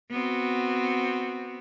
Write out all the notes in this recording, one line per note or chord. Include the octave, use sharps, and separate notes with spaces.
B3 C4 F#4